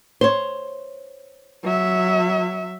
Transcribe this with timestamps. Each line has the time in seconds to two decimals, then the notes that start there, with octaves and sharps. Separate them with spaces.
0.21 C5 C#5
1.64 F#3 E5